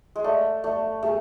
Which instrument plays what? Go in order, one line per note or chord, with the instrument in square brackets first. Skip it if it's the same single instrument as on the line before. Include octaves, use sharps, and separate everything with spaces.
[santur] G#3
[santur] A3 [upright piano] D5
[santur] A3 [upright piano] D5
[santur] A3 [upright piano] G#4